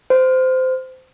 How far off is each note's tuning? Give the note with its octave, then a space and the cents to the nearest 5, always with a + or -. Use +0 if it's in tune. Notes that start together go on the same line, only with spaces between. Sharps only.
C5 -20